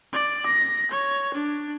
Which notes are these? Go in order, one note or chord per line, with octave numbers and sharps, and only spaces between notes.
D5
A#6
C#5
D4